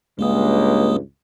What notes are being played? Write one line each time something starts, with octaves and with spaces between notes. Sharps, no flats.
C#2 G2 G#3 A#3 D#6